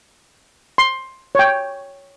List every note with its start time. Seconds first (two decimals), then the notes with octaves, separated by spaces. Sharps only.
0.78 C6
1.35 C#5 G5